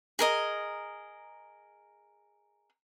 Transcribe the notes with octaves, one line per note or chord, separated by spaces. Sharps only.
G#4 A#4 D#5